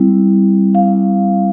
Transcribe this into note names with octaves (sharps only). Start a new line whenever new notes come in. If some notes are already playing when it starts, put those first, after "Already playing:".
Already playing: G3 C4 E4
F5